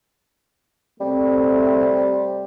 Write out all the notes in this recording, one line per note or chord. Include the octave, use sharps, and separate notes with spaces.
C3 G3 A3 C4